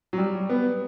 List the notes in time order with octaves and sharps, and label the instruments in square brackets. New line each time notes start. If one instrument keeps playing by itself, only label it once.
[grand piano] F#3
G3
B3